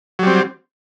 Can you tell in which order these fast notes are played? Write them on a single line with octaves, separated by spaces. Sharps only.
F#3 G3 C4